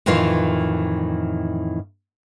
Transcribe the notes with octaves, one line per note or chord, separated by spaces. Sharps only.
F2 A2 D#3 E3 F4